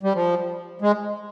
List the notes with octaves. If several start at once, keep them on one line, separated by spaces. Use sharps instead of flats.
G3
F3
G#3